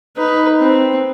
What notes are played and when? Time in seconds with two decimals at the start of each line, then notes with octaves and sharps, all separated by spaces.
0.17 D#4 B4
0.61 C4